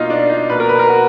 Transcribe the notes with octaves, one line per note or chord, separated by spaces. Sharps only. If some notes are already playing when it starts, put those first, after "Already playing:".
Already playing: B2 A#3 D#4 F4
D4
D#4
B2 A#3 B4
A#4
B4
A#4
F#4